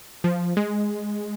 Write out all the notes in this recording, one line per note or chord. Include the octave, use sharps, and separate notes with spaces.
F3
G#3